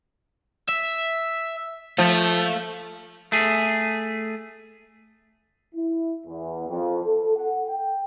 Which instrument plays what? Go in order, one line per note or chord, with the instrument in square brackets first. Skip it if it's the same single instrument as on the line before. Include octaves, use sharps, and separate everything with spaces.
[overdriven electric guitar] E5
[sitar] F3 [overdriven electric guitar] A3
[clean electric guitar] A3 G#4
[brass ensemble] E4
E2
F2
A4
F#5
G5